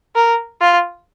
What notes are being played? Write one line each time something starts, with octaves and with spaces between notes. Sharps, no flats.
A#4
F4